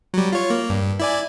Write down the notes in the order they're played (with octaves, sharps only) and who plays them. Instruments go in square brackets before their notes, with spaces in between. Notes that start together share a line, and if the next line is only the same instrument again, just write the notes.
[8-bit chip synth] F#3 G3
F4 C#5
A#3
G2
E4 D5 G#5